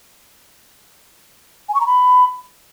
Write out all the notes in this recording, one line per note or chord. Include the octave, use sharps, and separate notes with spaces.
G#5
C#6
A#5
B5